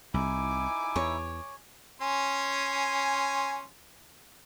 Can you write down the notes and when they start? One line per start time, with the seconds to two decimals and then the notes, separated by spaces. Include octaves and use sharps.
0.14 C2 D#4 E4 E5 G#5 D6
0.96 E2 C#5
2.01 C#4 G#5 C6